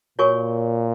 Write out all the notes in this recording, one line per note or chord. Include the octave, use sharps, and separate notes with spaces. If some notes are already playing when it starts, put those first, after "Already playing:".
A#2 F#4 A#4 C#5 G#5 C#6